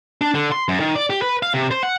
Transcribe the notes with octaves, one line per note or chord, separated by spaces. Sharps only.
D4
D3
C6
F#2
D#3
D5
G4
B4
F5
C3
C5
F#5